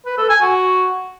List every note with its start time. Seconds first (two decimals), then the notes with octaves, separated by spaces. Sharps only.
0.06 B4
0.18 A4
0.30 G#5
0.41 F#4